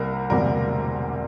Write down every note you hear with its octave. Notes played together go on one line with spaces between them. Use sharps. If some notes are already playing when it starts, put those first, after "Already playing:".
Already playing: C2 C3 G3 A#3 A#4
E1 D2 C3 G3 A#3 A#4